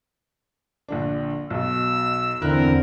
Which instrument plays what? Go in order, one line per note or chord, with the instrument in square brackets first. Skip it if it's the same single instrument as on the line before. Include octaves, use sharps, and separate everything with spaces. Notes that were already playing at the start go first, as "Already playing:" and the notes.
[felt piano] A#1 D3 D4
[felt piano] B1 B2 [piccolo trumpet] E6
[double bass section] E2 C4 [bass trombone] D3 [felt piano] E4 F#6 [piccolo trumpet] A#4